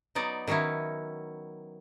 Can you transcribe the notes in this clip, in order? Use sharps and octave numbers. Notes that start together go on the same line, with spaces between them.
F#3 B3 D#4 D5
D#3 F#3 C#4 D#4 E4